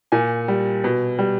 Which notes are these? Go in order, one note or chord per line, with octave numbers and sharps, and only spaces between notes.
A#2 G#5
G3
B2
G3